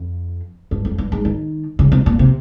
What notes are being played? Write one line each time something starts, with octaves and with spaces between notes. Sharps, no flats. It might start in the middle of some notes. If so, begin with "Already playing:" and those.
Already playing: F2
G2
F2
G2
G#2
D#3
C#3
C3
A#2
C3